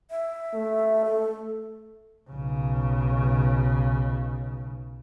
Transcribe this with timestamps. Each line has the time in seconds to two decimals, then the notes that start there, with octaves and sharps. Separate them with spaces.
0.11 E5
0.54 A3
1.05 A4
2.30 B1 C#3